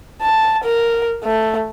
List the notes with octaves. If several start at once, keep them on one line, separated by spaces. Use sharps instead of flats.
A5
A#4
A3